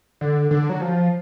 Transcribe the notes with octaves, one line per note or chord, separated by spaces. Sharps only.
D3
D3
F#3
F3